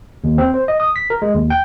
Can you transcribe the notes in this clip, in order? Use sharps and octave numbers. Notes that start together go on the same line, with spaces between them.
D#2
C4
C5
D#5
D#6
B6
A#4
G#3
D#2
G5